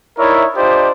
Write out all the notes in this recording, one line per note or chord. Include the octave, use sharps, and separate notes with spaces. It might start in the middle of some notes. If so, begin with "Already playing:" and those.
D#4 E4 A#4 C#5 D5 E5
D4 F4 G4 C5 D5 D#5